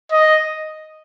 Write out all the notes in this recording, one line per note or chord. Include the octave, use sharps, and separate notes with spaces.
D#5